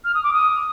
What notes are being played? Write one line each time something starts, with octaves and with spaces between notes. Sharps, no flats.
F6
D#6
D6
D#6